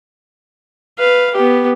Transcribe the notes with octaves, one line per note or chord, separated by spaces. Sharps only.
B4 F5
B3 G4